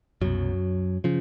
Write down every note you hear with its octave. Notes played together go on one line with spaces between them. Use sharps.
C2 F#2 B2 F#3
C#3 F3